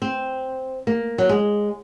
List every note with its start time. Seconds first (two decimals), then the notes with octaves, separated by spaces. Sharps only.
0.02 C4
0.87 A#3
1.18 F#3
1.29 G#3